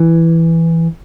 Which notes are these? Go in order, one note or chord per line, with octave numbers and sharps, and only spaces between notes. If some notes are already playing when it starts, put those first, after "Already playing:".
Already playing: E3